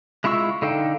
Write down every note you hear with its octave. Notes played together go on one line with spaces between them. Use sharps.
G#3 E4 F4 C#6 E6
D3 D#4 A4 F5 G5